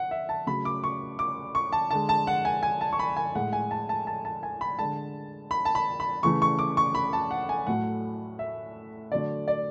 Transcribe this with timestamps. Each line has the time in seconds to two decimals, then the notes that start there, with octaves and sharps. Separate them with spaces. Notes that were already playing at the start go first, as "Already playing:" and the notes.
Already playing: F#5
0.11 E5
0.29 A5
0.46 C#3 F#3 A3 B5
0.65 D6
0.84 C#6
1.19 D6
1.55 C#6
1.72 A5
1.91 D3 G#3 A5
2.09 A5
2.27 F#5
2.45 G#5
2.63 G#5
2.81 A5
2.93 C#6
2.99 B5
3.17 G#5
3.35 A2 G#3 F#5
3.53 G#5
3.71 A5
3.89 A5
4.07 A5
4.25 A5
4.43 G#5
4.61 B5
4.79 D3 G#3 A5
5.51 B5
5.65 A5
5.75 B5
6.00 B5
6.23 C#3 E3 A3 C#6
6.42 C#6
6.59 D6
6.77 C#6
6.95 B5
7.13 A5
7.31 F#5
7.49 G#5
7.67 A2 F#3 A3 F#5
8.39 E5
9.11 D3 F#3 A3 D5
9.48 D5